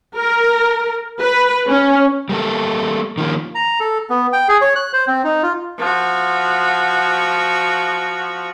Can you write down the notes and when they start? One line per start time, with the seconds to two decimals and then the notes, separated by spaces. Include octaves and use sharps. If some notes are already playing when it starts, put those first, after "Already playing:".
0.16 A#4
1.20 B4
1.67 C#4
2.29 G3 A#3 A4
3.18 D#3 F3 A#3
3.55 A#5
3.80 A4
4.10 B3
4.33 G5
4.48 G#4
4.61 C#5
4.76 F#6
4.93 C5
5.07 C4
5.24 D#4
5.43 F4
5.79 F3 F#4